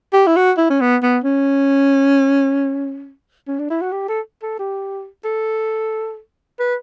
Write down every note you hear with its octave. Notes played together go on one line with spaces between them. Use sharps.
G4
E4
F#4
E4
C#4
B3
B3
C#4
C#4
D4
E4
F#4
G4
A4
A4
G4
A4
B4